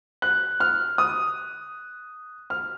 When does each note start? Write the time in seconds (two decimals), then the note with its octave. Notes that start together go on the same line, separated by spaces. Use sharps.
0.22 F#6
0.60 F6
0.98 D#6
2.50 F6